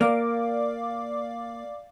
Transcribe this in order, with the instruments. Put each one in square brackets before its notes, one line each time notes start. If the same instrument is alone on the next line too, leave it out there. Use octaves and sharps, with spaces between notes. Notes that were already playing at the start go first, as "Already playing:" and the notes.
[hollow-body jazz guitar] A#3 [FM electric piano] D5 F5 D6